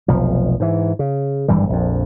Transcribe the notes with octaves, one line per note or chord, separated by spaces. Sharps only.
F1 B1 F3
G#2 E3
C#3
G#1 G2 E3 G3
A#1 F2